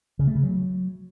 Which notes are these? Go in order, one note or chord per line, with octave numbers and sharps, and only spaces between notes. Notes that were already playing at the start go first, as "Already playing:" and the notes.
C#3
A3
C#3
F#3